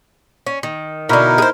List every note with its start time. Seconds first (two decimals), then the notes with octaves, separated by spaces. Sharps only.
0.46 C#4
0.63 D#3
1.09 B2 D3 D#4 E4 A#4
1.38 G#4 C5